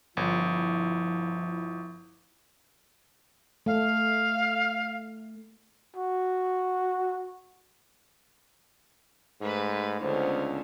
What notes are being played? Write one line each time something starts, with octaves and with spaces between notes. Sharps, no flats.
G1 F3 E4
A3 F5
F#4
G#2 A3 B4
C#2 D3 B3 C#4 C5